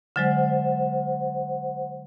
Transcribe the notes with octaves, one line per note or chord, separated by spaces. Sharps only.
D3 F#3 G#3 C5 F#5